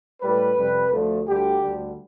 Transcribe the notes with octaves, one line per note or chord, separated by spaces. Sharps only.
A2 G3 B4
F2 C3 G3
D2 D3 F3 A3
D2 D3 G3 G4
D2 D3 G3